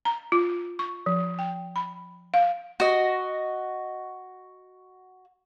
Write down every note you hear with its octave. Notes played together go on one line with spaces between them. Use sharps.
A#5
F4
C#6
F3
G5
B5
F5
F#4 D#5